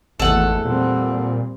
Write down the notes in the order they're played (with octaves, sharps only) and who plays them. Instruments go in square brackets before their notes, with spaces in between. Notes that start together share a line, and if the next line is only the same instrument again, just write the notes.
[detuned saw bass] G#1 [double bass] E2 A3 [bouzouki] A4 F#5
[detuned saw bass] A#2 [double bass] G3 C4